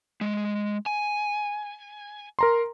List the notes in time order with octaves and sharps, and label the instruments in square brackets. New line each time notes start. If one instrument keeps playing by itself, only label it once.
[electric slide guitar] G#3
G#5
[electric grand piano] A#4 A#5 C6